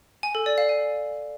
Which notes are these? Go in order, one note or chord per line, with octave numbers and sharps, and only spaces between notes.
G#5
A4
D5
F5
G#5